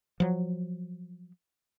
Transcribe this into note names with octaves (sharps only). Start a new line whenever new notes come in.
F3 F#3